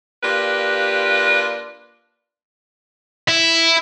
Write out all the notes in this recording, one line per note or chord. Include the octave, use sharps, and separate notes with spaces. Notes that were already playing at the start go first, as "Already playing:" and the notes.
A#3 D4 F4 G4 B4
E4